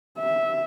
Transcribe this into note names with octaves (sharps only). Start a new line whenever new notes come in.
E5